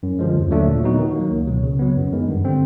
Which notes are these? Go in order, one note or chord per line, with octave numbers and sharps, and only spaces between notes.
F#2
D3 F3 G#3
D#2
D3 F#3 A3 D4
A#2
F#3 B3 D#4 F#4
D#3
F#3 A#3
C#2
B2 F#3
C#3
F#3 B3
F#2
D#3 G#3 B3
G2
D3 G3 C4